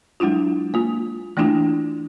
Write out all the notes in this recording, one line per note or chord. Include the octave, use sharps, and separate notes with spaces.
F#3 G#3 D4 E4 F4
A#3 F4
E3 A3 A#3 D4 E4 F4